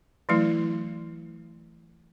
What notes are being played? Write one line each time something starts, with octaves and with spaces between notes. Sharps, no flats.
E3 F#3 A3 E4